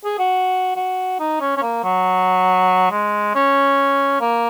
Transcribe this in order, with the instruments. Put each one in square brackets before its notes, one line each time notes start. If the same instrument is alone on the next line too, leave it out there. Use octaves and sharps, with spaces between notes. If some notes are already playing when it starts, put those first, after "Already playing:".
[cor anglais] G#4
F#4
F#4
D#4
C#4
C#4
A#3
F#3
G#3
C#4
A#3